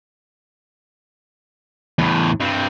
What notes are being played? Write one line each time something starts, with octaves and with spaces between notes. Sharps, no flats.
E2 A2
G2 C4